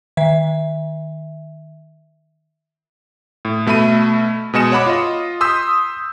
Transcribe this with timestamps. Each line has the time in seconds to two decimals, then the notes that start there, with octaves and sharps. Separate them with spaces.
0.17 D#3 E5
3.45 A2
3.66 B2 A3 E5 B5 D#7
4.54 B2 G#3 D#5 G#5 C#7 E7
4.72 C#5 F#5 B5 D6
4.86 F4 D#5
5.41 C6 D#6 E6 G6 B6